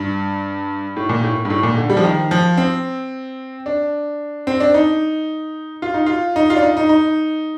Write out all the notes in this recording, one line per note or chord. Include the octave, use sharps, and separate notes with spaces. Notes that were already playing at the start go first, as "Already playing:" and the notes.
Already playing: G2
A2
A#2
A2
G2
A2
A#2
D3
G3
F3
D#3
F3
C4
D4
C4
D4
D#4
F4
D#4
F4
D#4
F4
D4
D#4
D#4
D#4